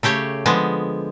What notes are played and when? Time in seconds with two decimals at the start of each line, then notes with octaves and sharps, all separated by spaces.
0.03 C#3 A3 G4 C#5
0.46 D3 F3 G#3 B3